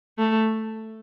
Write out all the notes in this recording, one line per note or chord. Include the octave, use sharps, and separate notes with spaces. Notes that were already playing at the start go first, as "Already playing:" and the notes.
A3